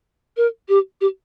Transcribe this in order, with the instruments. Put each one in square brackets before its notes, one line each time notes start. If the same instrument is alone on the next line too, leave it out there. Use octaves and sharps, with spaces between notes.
[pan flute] A#4
G4
G4